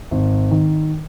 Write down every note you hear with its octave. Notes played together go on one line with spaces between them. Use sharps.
G#1
D#3